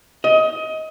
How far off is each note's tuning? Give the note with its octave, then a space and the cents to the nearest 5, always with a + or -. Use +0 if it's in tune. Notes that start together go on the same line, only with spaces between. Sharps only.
D#5 +20